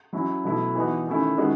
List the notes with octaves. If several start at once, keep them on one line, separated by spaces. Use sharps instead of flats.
F#3 C#4 E4
B2 F#3 A3 E4
E3 B3 D#4 F#4
D#3 A3 C#4 E4
D#3 G#3 C#4 F#4